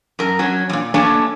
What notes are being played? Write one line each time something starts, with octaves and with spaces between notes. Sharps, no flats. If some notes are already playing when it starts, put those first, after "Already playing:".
F#2 A#4
F#3 C#4
F#2 A#2
A3 A#3 D4 C#5 G#5 A5